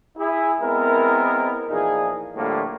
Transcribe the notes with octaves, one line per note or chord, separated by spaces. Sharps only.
E4 G#4
G#3 B3 C4 E4 A#4
A#2 E3 F3 D#4 G#4
A2 D3 F3 G3 A3 A#3